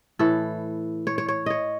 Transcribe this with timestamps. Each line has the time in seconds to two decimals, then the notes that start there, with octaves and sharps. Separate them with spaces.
0.19 A2 E3 A4
1.07 C#5
1.18 C#5
1.28 C#5
1.46 C#5 D#5